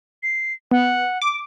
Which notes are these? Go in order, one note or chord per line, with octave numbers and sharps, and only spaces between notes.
C7
B3 F#5
D6